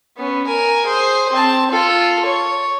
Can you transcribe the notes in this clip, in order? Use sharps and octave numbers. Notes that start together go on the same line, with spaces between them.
B3 C#4
A#4 G#5
G#4 C5
C4 A5
F4 A4
C#5